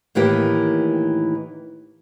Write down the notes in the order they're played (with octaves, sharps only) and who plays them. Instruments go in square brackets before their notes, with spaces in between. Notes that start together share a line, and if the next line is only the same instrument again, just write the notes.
[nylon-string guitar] A2 D#3 E3 A#3 G4